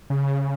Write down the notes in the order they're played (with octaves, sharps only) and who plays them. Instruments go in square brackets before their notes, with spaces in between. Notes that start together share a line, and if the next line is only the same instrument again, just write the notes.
[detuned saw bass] C#3